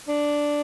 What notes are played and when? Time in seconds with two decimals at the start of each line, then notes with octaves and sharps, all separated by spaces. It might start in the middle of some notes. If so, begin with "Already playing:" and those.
0.08 D4